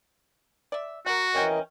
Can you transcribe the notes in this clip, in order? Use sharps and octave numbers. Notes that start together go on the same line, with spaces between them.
D5 E5
F#4 A#4 F#5
E3 C4 C#4 A#4 D#5 G5